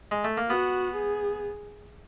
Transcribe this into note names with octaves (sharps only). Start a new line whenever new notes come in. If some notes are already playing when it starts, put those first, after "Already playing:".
G#3
A3
A#3
B3 F#4
G#4